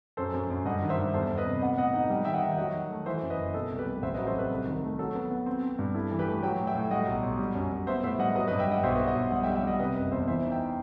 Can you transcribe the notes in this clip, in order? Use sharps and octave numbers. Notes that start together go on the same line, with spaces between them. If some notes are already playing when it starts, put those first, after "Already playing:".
F#2 A4 C5
F#2
F#2
G2 D#5 F#5
D#3
C5 E5
G2
E2 A4 C5
E2
B4 D#5
C3
B3 D#5 F#5
A2 D#5 F#5
D#4 D#5 F#5
G3 G5
D#3 E5 G5
D#5 F#5
D#3
G5
F#3 D#5 F#5
D#3
A3
E3 C5 E5
F#2
B4 D#5
F#1
B2 A4
C2
G4 B4
G3
A1 C5 E5
F#3 B4 D#5
A4 C5
C4 G4 B4
C2
D#3
A3
F#3 A4
B3
B3
C4
C4
G2
E4 A4
E3
G4 B4
A3
F#3 G5
A2
E5 G5
A2
G3 D#5 F#5
B1
B1
G3
F#2
F#2
B3 C5 E5
A2 C5 E5
G3 D#5 F#5
F#3 B4 D#5
G2 B4 D#5
E5 G5
G2 D#5 F#5
B1 C5 E5
B3 B4 D#5
D#5 F#5
B1
G3 D#5 F#5
E5 G5
G3
E5 G5
G3 D#5 F#5
C3 B4 D#5
F#1 B4 D#5
E2 C5 E5
E3 C5 E5
D#4
E5 G5